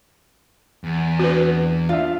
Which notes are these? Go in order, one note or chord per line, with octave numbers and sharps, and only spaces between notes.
E2
C4 D4 F#4 B4
D4 F4 E5